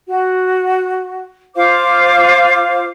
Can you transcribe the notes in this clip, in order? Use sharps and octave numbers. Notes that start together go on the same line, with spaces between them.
F#4
F4 C5 F5 D6